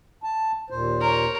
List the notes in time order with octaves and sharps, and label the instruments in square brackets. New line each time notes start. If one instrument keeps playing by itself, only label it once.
[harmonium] A5
D#2 A#2 C5
[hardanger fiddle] A#4 C#5